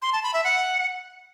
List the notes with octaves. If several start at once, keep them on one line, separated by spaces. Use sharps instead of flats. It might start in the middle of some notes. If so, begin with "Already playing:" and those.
C6
A5
B5
E5
F#5